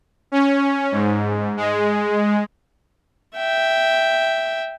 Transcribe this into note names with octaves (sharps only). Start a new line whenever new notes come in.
C#4
G#2
G#3
E5 G5